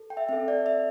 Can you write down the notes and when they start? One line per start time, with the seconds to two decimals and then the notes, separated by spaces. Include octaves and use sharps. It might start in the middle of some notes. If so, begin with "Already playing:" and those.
Already playing: A4
0.10 G5
0.17 E5
0.29 C4 A4 E5
0.48 D5
0.66 E5